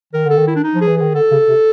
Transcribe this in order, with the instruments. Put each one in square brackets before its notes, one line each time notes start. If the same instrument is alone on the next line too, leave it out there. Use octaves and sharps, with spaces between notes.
[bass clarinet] D#3 [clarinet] A#4
[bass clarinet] D3 [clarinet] A4
[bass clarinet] D#3
[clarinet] E4
D4
D#4
[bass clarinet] F3
[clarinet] G#4
[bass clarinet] E3
[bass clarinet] D#3 [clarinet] G#4
[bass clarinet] D3 [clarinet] A4
[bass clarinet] C#3
C3